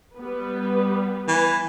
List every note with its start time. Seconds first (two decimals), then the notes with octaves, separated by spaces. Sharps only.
0.17 G3 B3 B4
1.28 E3